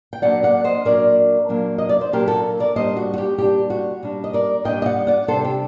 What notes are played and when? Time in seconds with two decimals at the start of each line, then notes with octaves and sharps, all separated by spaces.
0.13 G5
0.22 A#2 F#3 A#3 D4 D5 F#5
0.43 D5 F#5
0.64 C5 D#5
0.85 A#2 F#3 A#3 D4 A#4 D5
1.49 A#2 F#3 A#3 D4
1.78 D#5
1.89 D5
2.01 C5
2.12 A#2 F#3 A#3 D4 G4 A#4
2.28 F#4 A4
2.60 A#4 D5
2.75 A#2 G3 D4 C5 D#5
2.97 F#4
3.14 F#4
3.18 G4
3.38 A#2 G3 D4 G4
3.70 F#4
4.02 A#2 G3 D4
4.24 D#5
4.33 A#4 D5
4.64 A#2 G3 D4 D#5 G5
4.82 D#5
4.86 D5 F#5
5.07 D5 F#5
5.28 C3 G3 D4 A4 C5
5.44 G4